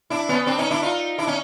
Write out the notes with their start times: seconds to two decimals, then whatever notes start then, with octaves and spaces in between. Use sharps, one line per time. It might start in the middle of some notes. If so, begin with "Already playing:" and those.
0.10 D4 E4
0.29 B3 C#4
0.46 C4 D4
0.59 C#4 D#4
0.71 D4 E4
0.83 D#4 F4
1.18 D4 E4
1.27 C#4 D#4